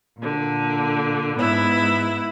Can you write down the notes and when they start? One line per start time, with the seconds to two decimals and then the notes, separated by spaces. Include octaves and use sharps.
0.19 A#2 D3
1.38 G#2 B3 E4